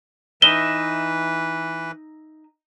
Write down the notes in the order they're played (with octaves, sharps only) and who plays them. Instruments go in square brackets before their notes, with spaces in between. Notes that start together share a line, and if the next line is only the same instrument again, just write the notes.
[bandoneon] E3 B4 [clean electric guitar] D#4 D#5 E5 [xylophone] G7